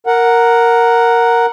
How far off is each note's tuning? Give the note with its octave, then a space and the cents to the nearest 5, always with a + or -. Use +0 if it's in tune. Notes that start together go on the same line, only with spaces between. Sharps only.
A#4 +0 F#5 +0